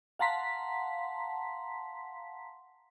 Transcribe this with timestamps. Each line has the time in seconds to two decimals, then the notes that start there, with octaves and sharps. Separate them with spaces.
0.19 F5 F#5 A5 A#5 C6 B6